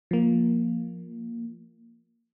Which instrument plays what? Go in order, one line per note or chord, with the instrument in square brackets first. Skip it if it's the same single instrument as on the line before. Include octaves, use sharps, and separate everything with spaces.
[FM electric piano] F3 A#3